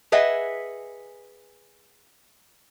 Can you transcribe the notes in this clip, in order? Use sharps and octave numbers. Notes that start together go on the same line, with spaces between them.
G#4 B4 D#5 E5 F#5 G#5